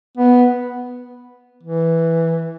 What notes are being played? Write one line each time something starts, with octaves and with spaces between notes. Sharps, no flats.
B3
E3